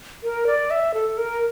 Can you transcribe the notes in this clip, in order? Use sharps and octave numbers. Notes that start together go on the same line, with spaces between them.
A#4
D5
E5
A4
A#4